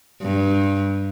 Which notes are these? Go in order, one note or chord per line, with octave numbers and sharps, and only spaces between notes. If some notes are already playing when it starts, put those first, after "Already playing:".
G2